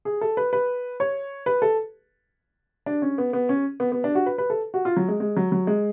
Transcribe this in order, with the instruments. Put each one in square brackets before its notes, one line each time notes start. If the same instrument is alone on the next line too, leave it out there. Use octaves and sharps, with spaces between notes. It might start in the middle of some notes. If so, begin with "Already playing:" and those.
[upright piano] G#4
A4
B4
B4
C#5
B4
A4
D4
C#4
B3
B3
C#4
B3
B3
D4
F#4
B4
B4
A4
F#4
F4
F#3
G#3
G#3
F#3
F#3
G#3